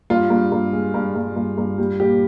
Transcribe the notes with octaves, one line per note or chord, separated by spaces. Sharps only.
G2 F4
G2
G2
G#3
G2
G2
G2
G2
G3
A#2 G4